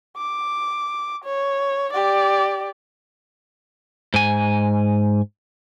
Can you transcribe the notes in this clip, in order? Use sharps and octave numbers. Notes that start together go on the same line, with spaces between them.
D6
C#5
G4 D5
G#2 G#5